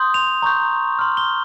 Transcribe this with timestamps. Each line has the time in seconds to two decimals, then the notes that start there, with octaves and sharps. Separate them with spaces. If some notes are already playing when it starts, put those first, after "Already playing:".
Already playing: C6 D#6 G6
0.14 F7
0.42 A#5 C#6 G6
0.99 C6 F6
1.17 G7